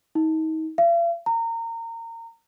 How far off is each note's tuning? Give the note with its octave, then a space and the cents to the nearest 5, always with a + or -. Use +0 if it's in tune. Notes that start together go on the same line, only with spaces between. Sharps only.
D#4 +35
F5 -45
A#5 -25